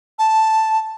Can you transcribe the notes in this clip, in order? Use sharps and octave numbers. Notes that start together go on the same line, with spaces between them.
A5